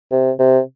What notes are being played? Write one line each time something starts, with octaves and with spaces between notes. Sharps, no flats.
C3
C3